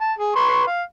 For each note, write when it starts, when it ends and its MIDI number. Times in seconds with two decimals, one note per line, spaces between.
0.01 0.12 81
0.18 0.35 68
0.35 0.63 71
0.35 0.63 84
0.35 0.63 85
0.67 0.82 77